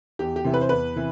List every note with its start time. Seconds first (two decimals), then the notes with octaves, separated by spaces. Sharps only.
0.19 E2 G4
0.36 G4
0.44 C3 E3
0.54 B4
0.61 C5
0.69 E2 B4
0.96 C3 E3